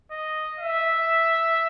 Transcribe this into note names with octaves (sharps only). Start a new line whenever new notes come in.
D#5
E5